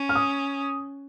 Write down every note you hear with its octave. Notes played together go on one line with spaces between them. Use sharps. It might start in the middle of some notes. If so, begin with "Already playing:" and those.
Already playing: C#4
F6
D#6